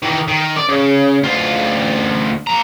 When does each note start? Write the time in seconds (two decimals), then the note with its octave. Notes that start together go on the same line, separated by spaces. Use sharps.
0.03 D#3 E3
0.28 D#3
0.57 D5
0.69 C#3
1.24 D2 F4
2.47 F3 A#5